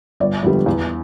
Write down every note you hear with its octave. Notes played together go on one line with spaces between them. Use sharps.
G1 D5
F2 D3 G3 B3
E2